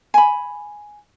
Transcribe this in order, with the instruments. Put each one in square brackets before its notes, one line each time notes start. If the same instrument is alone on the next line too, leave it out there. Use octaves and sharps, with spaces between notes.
[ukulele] G#5 B5